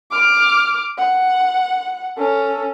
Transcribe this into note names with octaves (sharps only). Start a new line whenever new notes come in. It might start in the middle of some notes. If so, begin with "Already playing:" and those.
D6 F6
F#5
C#4 A4